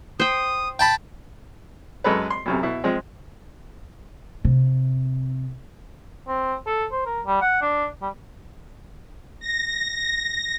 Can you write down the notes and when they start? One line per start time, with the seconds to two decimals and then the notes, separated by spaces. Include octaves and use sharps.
0.20 C5 G5 D#6
0.79 G5 A5 B5
2.04 F#2 G#3 A4 B4
2.30 C6
2.46 B1 F#2 C3
2.63 B2 E4
2.84 F3 G#3 C4
4.45 C3
6.27 C4
6.67 A4
6.92 C5
7.06 A#4
7.26 G3
7.42 F#5
7.62 D4
8.02 G3
9.40 A#6